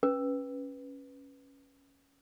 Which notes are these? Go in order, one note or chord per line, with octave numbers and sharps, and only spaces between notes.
C#4 B4